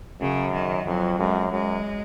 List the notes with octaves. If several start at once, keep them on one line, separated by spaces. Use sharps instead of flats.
F#2 C#3
D#3
F2 F#3
F#2 G#3
F#2 G#3